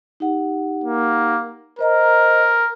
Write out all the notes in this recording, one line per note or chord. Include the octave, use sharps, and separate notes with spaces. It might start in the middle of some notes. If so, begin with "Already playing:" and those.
D#4 G4 F#5
A#3
A#4 C5 D#5 A#5